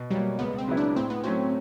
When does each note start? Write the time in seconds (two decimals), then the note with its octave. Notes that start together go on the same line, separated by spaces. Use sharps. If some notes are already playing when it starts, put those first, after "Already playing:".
Already playing: B2
0.11 F#3 G3 A#3
0.39 C#2 B3
0.58 C4
0.68 C#3 F#3 B3 E4
0.77 D4
0.96 A2 C4
1.10 B3
1.24 F#3 A3 C4 C#4 F#4